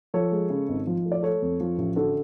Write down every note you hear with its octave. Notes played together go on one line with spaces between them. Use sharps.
F3 A4 C#5
G#3
C#3
G#1
F3
A3
D5
A3 A4 C#5
F2
F3
A1
D3 F#4 A4